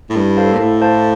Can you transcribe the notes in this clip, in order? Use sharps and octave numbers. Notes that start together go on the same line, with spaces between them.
A2
G2 E4
A4 C5 F5 A5
A#2
A2 E4
A4 C5 F5 A5